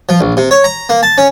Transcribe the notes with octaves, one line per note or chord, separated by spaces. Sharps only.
F3
A#1
C3
C#5
A#5
A#3
A5
C#4